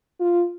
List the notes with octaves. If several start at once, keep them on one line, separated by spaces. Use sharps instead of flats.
F4